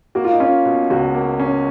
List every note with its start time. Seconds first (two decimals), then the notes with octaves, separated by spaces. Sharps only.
0.15 A#3 F#4
0.25 F4
0.33 D#4
0.40 C#4 F4
0.65 B2
0.90 C#2 F#4
1.15 A#3
1.40 C#4